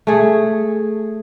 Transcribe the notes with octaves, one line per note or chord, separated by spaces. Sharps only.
A3 G#4